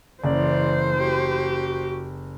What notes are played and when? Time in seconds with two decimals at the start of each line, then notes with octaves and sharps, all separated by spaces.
0.24 F#1 C#3 E3 C5 D5
0.97 F#4 G4